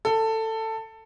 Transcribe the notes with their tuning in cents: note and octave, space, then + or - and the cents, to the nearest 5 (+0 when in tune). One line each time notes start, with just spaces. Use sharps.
A4 +15